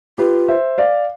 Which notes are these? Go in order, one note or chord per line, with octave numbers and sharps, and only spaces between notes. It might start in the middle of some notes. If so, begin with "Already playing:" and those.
F4 G4 B4
C5 E5
D5 F5